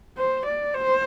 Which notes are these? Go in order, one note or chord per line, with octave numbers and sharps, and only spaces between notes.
C5
D5
C5